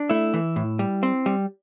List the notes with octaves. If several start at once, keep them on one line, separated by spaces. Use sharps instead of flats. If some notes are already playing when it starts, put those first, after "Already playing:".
Already playing: D4
A3 E4
E3
A2
G3
C4
G3